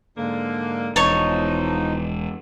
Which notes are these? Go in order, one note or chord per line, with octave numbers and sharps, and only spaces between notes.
G#2 D3 A#3
E1 F3 D#4 C#5 A5